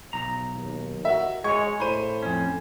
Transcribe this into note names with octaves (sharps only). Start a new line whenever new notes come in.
B1 A#5
D#2
F#4 A#4 E5
G#3 C#5 G#5 C#6
A2 C5 B5 D#7
F2 C#4